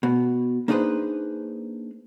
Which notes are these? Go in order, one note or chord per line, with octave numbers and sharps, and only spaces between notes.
B2
A#3 D4 D#4 G#4 B4 C5